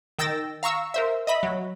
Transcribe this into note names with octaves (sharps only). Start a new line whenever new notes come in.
D#3 G5 E6 A6 A#6
F5 A#5 C#6 E6
A#4 C5 E5
D#5 E5 B5
F#3